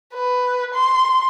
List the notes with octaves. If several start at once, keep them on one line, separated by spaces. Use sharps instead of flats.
B4
C6